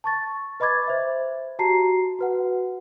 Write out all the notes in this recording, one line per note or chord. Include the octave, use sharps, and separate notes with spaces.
A5 C#6 A6
B4 D#5 B5 D6 G#6 A6
C5 E5
F#4 G4 A5 A#5 C7
F#4 B4 F#5